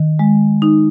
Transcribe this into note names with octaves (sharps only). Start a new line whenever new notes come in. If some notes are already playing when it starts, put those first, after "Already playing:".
Already playing: D#3
G#3
D#4